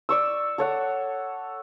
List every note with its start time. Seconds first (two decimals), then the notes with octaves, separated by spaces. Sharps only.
0.09 D5 C#6 E6
0.58 A4 C#5 F#5